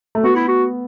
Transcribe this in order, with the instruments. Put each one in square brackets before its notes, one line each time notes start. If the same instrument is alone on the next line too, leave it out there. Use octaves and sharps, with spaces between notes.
[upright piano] A3
[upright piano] B3 [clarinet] F#4
[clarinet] E4
F#4